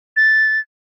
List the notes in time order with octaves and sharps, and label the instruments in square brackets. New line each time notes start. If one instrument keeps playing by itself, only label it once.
[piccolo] A6